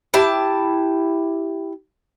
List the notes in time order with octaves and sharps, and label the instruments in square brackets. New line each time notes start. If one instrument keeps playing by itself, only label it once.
[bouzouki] E4 G4 A5